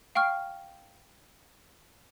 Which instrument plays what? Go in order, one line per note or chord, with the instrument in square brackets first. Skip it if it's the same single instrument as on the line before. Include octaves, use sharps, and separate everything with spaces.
[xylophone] F5 G5 C#6 F6